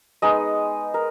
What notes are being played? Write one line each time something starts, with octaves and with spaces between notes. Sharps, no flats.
G#3 B3 D#4 D#5
A#4